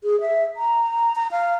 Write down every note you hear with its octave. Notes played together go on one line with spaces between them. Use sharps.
G#4
E5
A#5
A#5
F5